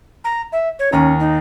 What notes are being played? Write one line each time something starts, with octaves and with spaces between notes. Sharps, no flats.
A#5
E5
C#5
D#2 C#4 A#5
D#4